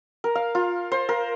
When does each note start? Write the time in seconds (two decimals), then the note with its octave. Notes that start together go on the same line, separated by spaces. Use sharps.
0.24 A#4
0.35 F5
0.55 F4
0.92 C5
1.09 A#4